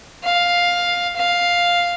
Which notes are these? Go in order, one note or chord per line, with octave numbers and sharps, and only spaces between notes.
F5
F5